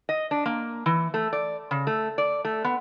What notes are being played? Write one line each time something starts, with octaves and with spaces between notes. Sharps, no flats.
D#5
D4
A#3
E3
A3
D5
C#3
A3
D5
A3
B3